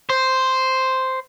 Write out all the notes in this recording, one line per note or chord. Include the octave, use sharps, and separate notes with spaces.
C5